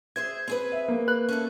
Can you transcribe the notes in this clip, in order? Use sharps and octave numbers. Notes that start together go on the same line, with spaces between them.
G#4 C5 E5 G#6
C4 G#4 B4
E5
A#3
B4 F#6
C#4 A4 E5